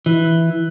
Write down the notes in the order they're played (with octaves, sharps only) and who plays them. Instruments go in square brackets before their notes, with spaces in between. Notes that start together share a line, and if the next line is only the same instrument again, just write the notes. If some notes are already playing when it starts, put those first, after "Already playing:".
[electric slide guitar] E3